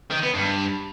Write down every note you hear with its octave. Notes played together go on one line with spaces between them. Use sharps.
D#3
B3
G2